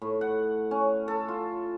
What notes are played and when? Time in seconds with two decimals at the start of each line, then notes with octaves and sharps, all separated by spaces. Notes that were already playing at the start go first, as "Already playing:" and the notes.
0.02 A2
0.21 F#5
0.71 C#4
1.08 A4
1.28 F4